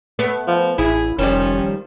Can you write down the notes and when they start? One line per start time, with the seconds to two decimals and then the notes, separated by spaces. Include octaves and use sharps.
0.19 A3 B3
0.47 F3
0.78 A1 E4 G#4
1.19 F1 D#3 F3 G3 C#4